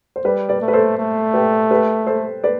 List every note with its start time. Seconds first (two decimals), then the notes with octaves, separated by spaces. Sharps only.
0.16 C5
0.24 G3 B4 D5
0.49 B4 D5
0.62 A3
0.68 B4
0.73 A4 C5
0.98 A3
1.34 G4 B4
1.71 G4 B4
2.07 A4 C5
2.44 B4 D5